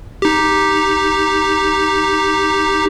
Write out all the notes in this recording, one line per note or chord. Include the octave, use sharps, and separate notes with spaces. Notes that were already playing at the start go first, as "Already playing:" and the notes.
D#4 G4